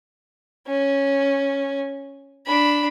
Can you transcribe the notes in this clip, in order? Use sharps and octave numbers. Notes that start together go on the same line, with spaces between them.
C#4
D4 B5